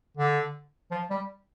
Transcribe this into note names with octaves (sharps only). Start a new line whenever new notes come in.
D3
F3
G3